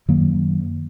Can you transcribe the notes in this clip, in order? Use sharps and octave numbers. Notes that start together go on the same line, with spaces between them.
F#2 D#3 F#3 A#3